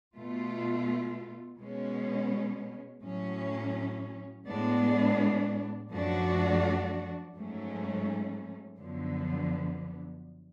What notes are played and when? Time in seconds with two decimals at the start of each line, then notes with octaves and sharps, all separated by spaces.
0.14 B2 A3 F4
1.59 B2 G#3 C#4
3.02 A2 F#3 C#4
4.47 A2 G#3 B3 D4
5.91 F#2 F3 A3 D4 F#4
7.36 G#2 F#3 A3 C#4
8.79 F#2 D3 F3 B3